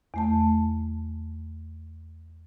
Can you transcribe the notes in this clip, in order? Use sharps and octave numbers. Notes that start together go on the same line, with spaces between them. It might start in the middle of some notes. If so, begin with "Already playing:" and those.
E2 A3 A5